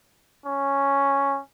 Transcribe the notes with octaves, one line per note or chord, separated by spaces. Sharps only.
C#4